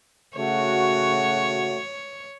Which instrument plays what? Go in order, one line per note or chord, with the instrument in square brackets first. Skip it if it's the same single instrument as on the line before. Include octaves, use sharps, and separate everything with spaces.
[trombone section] C#3 A3 F#4 [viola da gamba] C#5